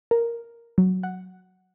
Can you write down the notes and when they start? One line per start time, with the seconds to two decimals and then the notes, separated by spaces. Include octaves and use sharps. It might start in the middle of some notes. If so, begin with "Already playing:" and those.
0.11 A#4
0.78 F#3
1.03 F#5